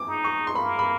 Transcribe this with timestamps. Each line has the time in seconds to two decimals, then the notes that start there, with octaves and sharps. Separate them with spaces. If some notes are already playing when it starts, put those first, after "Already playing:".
Already playing: D6
0.08 D#4
0.24 C#6
0.47 C6
0.55 A#3 B5
0.79 B5